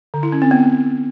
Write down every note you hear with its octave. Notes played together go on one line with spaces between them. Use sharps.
D3
E4
C#4
C4
B3